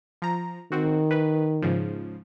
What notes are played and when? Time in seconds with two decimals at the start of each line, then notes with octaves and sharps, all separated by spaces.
0.22 F3 A#5
0.72 D#3 C4 F#4
1.11 B4
1.62 G#2 C#3 F3